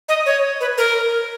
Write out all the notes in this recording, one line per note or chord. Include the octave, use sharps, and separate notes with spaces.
D#5
C#5
B4
A#4